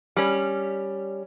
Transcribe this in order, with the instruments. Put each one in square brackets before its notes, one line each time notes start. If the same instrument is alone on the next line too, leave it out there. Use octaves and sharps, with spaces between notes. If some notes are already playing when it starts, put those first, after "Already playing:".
[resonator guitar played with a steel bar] G3 C#4